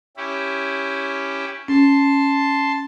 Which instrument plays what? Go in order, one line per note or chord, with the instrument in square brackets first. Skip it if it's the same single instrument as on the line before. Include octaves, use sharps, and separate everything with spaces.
[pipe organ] C#4 E4 G4
[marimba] C#4 [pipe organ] A5 C6